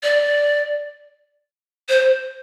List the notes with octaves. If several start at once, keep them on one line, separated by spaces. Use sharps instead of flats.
D5
C5